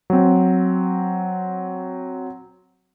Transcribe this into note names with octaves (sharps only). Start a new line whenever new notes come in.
F#3 C4